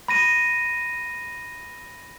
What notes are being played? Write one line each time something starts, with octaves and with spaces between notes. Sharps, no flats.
B5 A#6 D#7